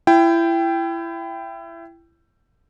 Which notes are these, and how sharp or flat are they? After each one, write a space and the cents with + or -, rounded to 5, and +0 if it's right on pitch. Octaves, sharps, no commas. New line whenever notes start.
E4 +25 G5 +0